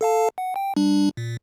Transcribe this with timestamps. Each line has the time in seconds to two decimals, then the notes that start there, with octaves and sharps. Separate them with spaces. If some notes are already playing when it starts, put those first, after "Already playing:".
0.01 A4 F5 A5
0.38 F#5
0.56 G5
0.76 G3 D4
1.17 A#2